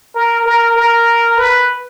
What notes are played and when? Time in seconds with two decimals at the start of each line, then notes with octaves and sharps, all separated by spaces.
0.15 A#4
0.45 A#4
0.76 A#4
1.37 B4